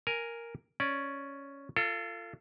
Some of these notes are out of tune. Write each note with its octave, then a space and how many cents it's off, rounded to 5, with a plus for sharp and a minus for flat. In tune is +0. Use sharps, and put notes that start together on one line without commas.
A#4 +0 G#5 +0
C#4 +0 D5 +0
F4 -20 A4 +25